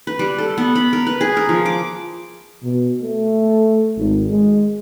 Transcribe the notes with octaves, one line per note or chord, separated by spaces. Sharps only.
B4
G3
A4
B3
B5
A#4
B4
G#4
A#4
F3
D6
B2
A3
G#1
G#3